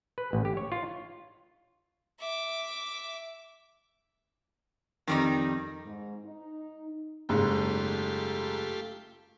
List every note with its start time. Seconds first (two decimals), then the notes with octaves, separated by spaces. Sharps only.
0.18 B4
0.33 A1
0.45 G4
0.57 C#5
0.72 F4
2.19 E5 D6
5.07 F2 D#3 G3 D#4
5.85 G#2
6.25 D#4
7.29 F#1 G#2 A3 F4 G4